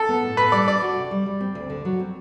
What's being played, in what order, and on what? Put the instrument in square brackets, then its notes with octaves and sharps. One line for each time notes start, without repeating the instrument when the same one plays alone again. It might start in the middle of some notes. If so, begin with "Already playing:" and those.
Already playing: [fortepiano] A4
[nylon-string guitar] B3
A2
[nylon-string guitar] A2 [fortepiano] B4
[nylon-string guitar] G3 [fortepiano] D5
[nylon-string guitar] D4 [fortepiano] D5
[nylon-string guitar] F#4
C3
G3
G3
C4
D2
D3
F#3
C4